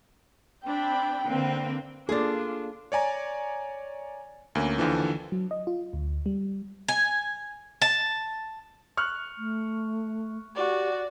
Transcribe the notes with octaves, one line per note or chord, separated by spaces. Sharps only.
C4 D4 G5 B5
D3 A#3 C4 B4
A#3 D4 F4 G#4 A4 D5
C#5 D5 G#5 A#5
D2 A#3 C#4
D#2 D3 E3 F3
F#3
D#5
F4
D2
G3
G#5
A5
C#6 F6 F#6
A3
F#4 G4 D5